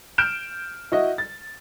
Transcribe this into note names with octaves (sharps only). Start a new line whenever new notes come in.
F6 G6 D7 E7
E4 F#4 D#5
A6